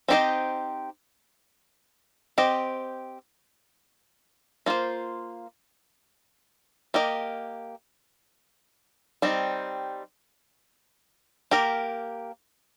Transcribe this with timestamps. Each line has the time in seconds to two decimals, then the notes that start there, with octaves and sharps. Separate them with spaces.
0.08 C4 D#4 G4 C5 D#5
2.38 C4 G4 D#5
4.66 A#3 F4 C5
6.94 A#3 G4 A#4 D#5
9.22 G3 C4 D#4
11.51 A#3 G4 A#4